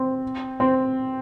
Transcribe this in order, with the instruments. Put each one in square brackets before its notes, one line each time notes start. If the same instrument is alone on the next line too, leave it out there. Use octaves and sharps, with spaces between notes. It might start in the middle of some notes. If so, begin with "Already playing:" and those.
Already playing: [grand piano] C4
C4